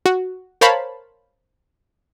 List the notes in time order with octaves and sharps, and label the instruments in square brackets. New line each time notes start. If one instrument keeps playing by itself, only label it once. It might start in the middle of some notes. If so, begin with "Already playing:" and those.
[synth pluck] F#4
A#4 C5 C#5 F5 A5 B5